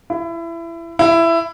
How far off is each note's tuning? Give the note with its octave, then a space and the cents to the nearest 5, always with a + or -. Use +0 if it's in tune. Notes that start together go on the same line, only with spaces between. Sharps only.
E4 +25
E4 +15